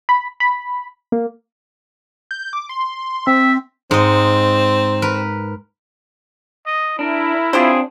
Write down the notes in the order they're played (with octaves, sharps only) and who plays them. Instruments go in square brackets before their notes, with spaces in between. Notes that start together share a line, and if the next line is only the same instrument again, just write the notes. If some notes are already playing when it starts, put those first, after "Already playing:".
[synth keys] B5
B5
A#3
[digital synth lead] G6
D6
C6
[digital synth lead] C4 [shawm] E5
[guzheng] G#2 D#5 [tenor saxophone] C4
[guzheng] A#4 B4
[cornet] D#5
[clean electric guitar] D4 [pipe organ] E4 [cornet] A#4
[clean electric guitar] C4 D4 [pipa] F4 G4 C5 [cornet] G#4